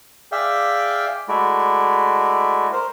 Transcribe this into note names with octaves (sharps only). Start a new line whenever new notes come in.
G#4 D5 E5 F5 G5
G#3 A3 E4 F#4 D5
A#4 C5